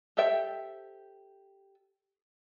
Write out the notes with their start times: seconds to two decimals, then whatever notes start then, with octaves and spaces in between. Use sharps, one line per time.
0.17 G4 A4 C5 E5 G5